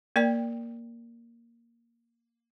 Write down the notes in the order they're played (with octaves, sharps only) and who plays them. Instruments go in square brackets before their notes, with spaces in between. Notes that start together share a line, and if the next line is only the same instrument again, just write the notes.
[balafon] A#3 A#4 D5 G5